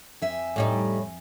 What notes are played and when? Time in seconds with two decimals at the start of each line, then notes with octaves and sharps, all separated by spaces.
0.22 F2 E5 G#5
0.56 A2 G3 D#4